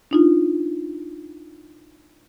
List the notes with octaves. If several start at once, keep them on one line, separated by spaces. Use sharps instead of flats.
D4 D#4 F4